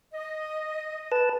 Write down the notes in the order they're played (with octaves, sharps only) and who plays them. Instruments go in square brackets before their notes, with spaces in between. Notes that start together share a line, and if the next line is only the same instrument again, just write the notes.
[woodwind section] D#5
[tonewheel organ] B4 A5